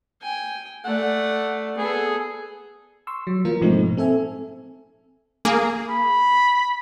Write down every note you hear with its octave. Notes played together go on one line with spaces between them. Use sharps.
G5 G#5
A3 D5 F#5
B3 G#4 A4
C6 C#6 E6
F#3
E3 A#3 F4 A#4
G#2 B2 F3 A3 C4 D#4
A#2
C4 A4 E5 G#5
A#3 G#4
B5